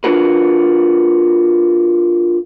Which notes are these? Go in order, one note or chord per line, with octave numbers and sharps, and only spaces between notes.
D4 F4 F#4 A#4 B4